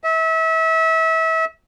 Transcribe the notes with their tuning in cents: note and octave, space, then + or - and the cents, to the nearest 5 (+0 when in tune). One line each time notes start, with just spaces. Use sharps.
E5 -30